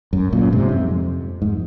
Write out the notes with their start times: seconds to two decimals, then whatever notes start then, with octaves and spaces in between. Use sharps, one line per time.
0.13 F#2
0.32 F#2 A#2
0.52 G#2 C3
0.72 F2
1.42 G#2